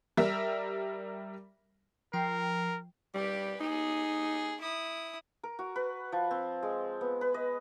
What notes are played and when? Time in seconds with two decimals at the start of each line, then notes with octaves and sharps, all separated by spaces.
0.17 G3 A#4 E5
2.13 F3 A#4 G5 C7
3.14 G3 G4 B4
3.60 D#4 G#4
4.61 E4 D#6
5.43 A#4
5.59 F#4
5.76 B4
6.12 F3
6.31 C4
6.63 G#3
7.01 B3
7.21 B4
7.34 D#5